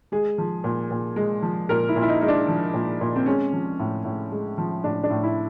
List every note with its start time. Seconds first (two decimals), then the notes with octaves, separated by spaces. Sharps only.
0.12 G#3 G#4
0.38 F3
0.64 A#2
0.91 A#2
1.16 G#3
1.42 F3
1.69 A#2 A#4
1.89 E4
1.96 A#2
2.02 E4
2.08 D#4
2.21 G#3 D#4
2.28 D4
2.48 F3
2.74 A#2
3.01 A#2
3.16 C4
3.26 G#3 C#4
3.53 F3
3.80 A2
4.05 A2
4.31 G#3
4.58 F3
4.84 A2 D4
5.04 D4
5.10 A2
5.23 E4